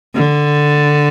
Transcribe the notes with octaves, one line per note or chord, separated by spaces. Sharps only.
D3